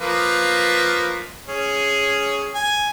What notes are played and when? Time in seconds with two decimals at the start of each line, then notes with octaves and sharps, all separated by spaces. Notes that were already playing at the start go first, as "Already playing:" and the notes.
0.01 F3 A#3 B4
1.48 C#4 G#4
2.55 G#5